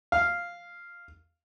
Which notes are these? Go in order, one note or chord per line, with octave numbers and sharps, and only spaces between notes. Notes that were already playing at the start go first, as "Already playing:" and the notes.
F5